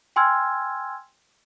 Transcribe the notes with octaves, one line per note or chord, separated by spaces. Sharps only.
G5 G#5 C6 E6 F6 G#6